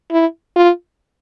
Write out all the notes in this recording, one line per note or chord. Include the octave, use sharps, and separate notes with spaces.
E4
F4